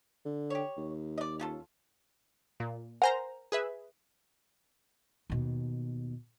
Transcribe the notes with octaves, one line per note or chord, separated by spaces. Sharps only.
D3
G4 C#5
D#2
D5 D#5
C#4 F4 A4
A#2
A#4 C5 F#5 G#5 A#5
G#4 B4 E5
D#2 B2